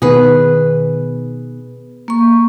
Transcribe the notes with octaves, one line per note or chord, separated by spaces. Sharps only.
B2 D#3 B3 G#4 B4
A#3 C#6